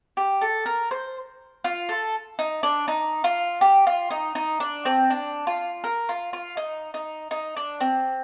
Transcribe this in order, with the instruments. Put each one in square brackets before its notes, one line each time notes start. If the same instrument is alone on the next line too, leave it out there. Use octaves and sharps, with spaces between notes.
[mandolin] G4
A4
A#4
C5
F4
A4
D#4
D4
D#4
F4
G4
F4
D#4
D#4
D4
C4
D4
F4
A#4
F4
F4
D#4
D#4
D#4
D4
C4